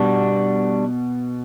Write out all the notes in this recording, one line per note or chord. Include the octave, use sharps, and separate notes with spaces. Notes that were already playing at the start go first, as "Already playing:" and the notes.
Already playing: B2 G3 D4 F#4